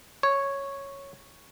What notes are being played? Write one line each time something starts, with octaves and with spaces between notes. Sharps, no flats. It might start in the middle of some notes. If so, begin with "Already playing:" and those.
C#5